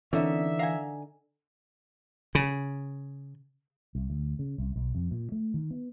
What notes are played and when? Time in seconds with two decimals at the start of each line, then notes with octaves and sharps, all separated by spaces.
0.13 D3 E3 C4 C#4 D#4 E5
0.59 F5 F#5 G#5 A#5
2.35 C#3
3.95 C2
4.10 D2
4.39 C#3
4.58 C2
4.76 B1
4.95 F2
5.11 A#2
5.32 A3
5.54 D#3
5.71 B3